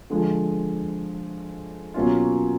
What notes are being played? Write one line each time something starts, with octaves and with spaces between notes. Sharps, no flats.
D3 F3 G#3
B2 F#3 A#3 C#4 F4